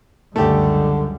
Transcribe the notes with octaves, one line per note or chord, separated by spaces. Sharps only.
C#2 F#2 D3 G3 A3 G4